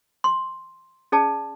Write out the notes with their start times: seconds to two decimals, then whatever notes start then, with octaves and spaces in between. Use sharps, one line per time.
0.24 C6
1.12 C#4 G#4 D5 A5